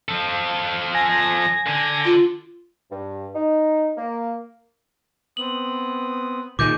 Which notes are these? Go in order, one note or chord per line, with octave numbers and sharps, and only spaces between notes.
F3 A4
G#5 A#6
D3
F4
G2
D#4
A#3
B3 C4 D#6 F#7
A#2 D#3 G#4 D6 G6